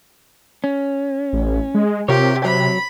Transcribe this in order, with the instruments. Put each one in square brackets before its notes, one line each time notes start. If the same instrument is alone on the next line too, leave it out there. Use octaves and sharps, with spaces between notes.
[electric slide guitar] C#4
[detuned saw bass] A1
G#3
[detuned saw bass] C3 [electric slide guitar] F4 A#4 C#5 [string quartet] G4
[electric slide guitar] F#3 [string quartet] B5